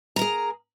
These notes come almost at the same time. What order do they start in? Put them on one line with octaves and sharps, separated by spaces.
A#5 A#4 G#4